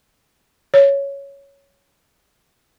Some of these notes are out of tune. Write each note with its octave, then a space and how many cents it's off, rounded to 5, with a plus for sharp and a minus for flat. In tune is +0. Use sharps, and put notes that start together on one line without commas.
C#5 +5